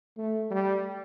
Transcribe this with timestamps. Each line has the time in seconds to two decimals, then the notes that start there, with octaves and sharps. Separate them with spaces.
0.18 A3
0.51 G3